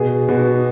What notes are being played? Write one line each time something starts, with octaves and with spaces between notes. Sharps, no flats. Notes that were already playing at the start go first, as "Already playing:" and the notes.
Already playing: B2 G#4
B2 F#4